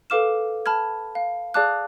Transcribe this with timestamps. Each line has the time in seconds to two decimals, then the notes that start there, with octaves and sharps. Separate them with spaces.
0.10 A4 B4 F5 D6 F6 E7
0.66 A5 B5 F6 G#6
1.15 F5
1.54 G#4 D5 F5 A5 D6 F#6